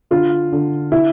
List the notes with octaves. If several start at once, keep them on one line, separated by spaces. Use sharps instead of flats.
D3 F4
D3
E4